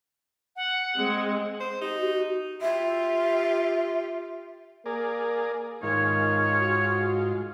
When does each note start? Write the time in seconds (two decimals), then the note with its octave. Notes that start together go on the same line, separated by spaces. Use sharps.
0.56 F#5
0.96 G#3 C4
1.60 C5
1.81 D#4 G4
1.98 F#4
2.61 F4 G4 E5
4.86 A#3 G#4 A#4 D5
5.83 G#2 D#3 F4 C#5
6.60 F#4